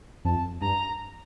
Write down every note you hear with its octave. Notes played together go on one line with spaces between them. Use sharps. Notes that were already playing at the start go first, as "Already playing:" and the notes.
F2 A5
G2 A#5